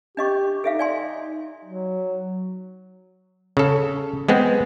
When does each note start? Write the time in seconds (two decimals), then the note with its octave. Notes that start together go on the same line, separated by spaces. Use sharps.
0.17 D4 G4 D#5 C#6
0.64 D#4 A4 E5 F5
0.79 D5 G#5 C6
1.65 F#3
3.57 C#3 A4
4.29 G#3 B3 C4